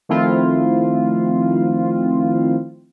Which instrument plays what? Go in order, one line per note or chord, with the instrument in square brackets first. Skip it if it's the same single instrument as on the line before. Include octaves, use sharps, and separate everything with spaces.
[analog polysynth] D#3 F3 A3 C4 E4 F4